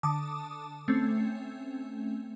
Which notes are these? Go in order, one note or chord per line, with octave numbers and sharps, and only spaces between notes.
D3 A5 D6 D#6
A3 C4 C#4